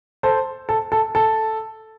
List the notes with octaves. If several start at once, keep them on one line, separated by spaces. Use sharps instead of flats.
A4 C5
A4
A4
A4